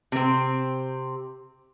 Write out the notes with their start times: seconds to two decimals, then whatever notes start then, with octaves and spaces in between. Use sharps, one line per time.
0.12 C3 C4